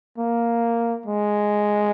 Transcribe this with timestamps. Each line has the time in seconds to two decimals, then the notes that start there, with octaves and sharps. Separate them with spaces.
0.18 A#3
1.06 G#3